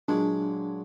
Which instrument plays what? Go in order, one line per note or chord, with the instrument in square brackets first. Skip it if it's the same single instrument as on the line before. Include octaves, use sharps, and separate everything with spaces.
[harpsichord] A#2 F#3 G#3 [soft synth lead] D4